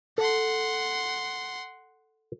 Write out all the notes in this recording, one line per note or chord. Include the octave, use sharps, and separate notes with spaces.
A4 F#5 C6